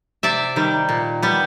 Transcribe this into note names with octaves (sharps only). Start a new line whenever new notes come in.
C3 D5 E5
D#3 G3
A#2
G3 B3